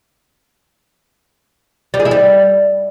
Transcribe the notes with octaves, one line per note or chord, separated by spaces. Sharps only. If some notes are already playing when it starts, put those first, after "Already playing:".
G3
G#4
E4
G3